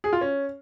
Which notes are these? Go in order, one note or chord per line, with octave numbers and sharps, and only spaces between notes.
G#4
F4
C#4